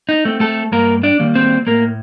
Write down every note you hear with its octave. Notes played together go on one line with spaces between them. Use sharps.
D#4
A3 C4
A3 A4
G2 A#3 A#4
D4 D5
D#3 G3 A#3
C4 C5
A2 A#3 A#4